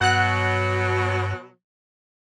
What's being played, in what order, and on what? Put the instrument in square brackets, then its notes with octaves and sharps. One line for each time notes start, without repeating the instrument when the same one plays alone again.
[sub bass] G2 [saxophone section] B2 F#3 [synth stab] F#5 F#6